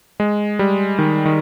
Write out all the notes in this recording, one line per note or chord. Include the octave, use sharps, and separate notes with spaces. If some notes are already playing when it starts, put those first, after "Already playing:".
G#3
G3
D#3
D#3